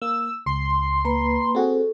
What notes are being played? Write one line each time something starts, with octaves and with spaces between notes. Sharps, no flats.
A#3 E6
C#2 C6
A#3 B4 B5
C4 F#4 G#4 A4